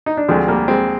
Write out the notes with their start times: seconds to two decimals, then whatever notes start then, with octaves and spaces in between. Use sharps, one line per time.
0.06 D#4
0.17 D4
0.28 D2 D3 F3 G#3 C4
0.48 G3 A#3
0.68 G#3 C4